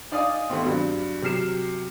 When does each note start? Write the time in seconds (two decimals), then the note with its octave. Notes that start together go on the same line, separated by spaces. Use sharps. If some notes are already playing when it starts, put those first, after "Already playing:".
0.12 D#4 D5 F5 G#5 D#6
0.50 D#2 G3 A3 B3 C4
0.65 G2 F#3
1.22 C3 F#3 F6 C7 E7